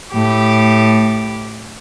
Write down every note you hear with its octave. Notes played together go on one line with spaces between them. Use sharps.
A2 G4